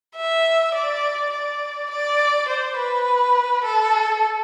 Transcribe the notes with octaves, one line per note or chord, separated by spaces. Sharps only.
E5
D5
D5
D5
C5
B4
A4